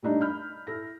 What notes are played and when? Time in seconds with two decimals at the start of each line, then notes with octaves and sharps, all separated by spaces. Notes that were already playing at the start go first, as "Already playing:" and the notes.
0.03 G3 A3 D4 D#4
0.21 B5 F6 G6
0.67 E4 A4 A#6